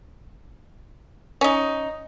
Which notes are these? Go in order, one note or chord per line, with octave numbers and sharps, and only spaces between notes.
C#4 D#4